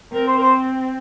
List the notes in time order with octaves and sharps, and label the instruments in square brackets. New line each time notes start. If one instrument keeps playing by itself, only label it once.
[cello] C4 [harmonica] A#4
[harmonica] C5
A#4
C5